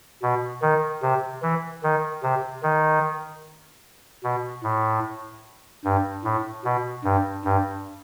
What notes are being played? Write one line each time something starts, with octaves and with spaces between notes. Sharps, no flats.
B2
D#3
C3
E3
D#3
C3
D#3
B2
A2
G2
A2
B2
G2
G2